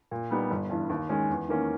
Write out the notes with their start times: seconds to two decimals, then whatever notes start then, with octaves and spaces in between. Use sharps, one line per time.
0.11 A#2
0.30 G3 B3 D#4
0.50 G1
0.70 G2 E3
0.89 D#2
1.09 D#3 G#3 C#4
1.29 E2
1.48 D#3 A#3 C#4